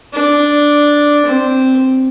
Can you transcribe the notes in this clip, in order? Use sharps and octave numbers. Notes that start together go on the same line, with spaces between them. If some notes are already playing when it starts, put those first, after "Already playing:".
D4
C4